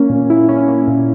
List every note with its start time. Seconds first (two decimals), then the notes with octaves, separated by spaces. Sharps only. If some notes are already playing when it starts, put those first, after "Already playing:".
Already playing: A#3 C#4
0.10 A#2
0.30 E4
0.49 C#4
0.68 A#3
0.88 A#2